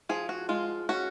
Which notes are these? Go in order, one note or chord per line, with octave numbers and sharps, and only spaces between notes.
F3 G#4
F#4
G#3 F4
C#4 F#4